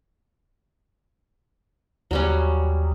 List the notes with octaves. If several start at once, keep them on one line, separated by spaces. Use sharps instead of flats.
D#2 F#3 G3 C#4